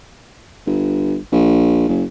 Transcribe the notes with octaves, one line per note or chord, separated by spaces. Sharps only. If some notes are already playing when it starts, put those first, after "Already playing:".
G1
A#1
F#1